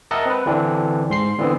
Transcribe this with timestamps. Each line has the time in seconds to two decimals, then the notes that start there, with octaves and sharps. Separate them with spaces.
0.11 A#4 D#5 E5 F#5 A5
0.26 C4 B4
0.46 D3 E3 C4 D4
1.10 G#2 C6 C7
1.38 D3 E3 B3 C4